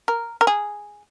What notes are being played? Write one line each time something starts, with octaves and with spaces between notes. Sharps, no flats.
A#4
A#4
G#4